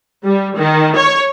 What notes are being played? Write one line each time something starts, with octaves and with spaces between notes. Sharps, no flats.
G3
D#3
C#5